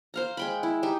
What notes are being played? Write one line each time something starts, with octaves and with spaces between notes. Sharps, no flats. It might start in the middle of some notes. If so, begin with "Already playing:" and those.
C5 F5 A#5
G#3 G5 B5
E4
D#4 G4 E5